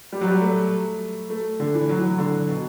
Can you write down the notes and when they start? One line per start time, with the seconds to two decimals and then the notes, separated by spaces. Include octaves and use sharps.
0.12 G3
0.21 F#3
0.27 G3
0.41 A3
1.30 A3
1.60 D3
1.74 E3
1.89 F#3
1.99 E3
2.04 F#3
2.18 D3
2.49 B2